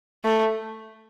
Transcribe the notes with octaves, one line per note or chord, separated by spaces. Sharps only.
A3